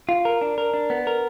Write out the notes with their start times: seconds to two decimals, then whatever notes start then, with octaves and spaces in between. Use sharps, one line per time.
0.09 F4
0.25 A#4
0.41 D4
0.58 A#4
0.74 D4
0.90 B3
1.07 A#4